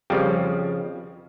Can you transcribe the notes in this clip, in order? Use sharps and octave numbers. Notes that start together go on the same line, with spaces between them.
F2 C#3 F3 G3